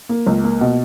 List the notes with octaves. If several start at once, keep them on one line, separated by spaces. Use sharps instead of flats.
A#3
C#2
A#3
B2